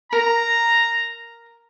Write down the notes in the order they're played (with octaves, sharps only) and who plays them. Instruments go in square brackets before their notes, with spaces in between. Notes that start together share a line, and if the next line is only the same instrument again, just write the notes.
[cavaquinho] A#4 [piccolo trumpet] A#5